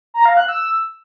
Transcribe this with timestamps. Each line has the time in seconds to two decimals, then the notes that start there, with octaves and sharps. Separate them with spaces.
0.14 A#5
0.25 F5
0.37 F#6
0.48 E6